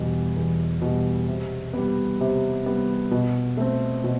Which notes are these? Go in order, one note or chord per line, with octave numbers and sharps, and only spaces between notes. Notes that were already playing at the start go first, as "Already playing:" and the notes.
Already playing: E2 B2 G3
E2
B2 G3
C3
G3 B3
C3
G3 B3
B2
A3 C4
B2